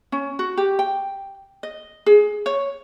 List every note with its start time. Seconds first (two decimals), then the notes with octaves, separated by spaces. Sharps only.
0.12 C#4
0.39 F#4
0.57 G4
0.79 G5
1.63 D#5
2.06 G#4
2.46 C#5